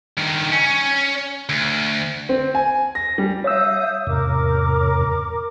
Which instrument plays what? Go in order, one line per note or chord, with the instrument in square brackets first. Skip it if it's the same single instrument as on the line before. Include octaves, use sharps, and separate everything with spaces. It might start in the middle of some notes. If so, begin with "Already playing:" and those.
[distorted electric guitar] G2 D#3
C#4
D2
[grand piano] C4
G#5
A#6
G3
[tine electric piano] C#5 E6 [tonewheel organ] E5 F5 [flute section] D#6 G6
[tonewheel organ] E2 G#2 C3 [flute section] A#4 D6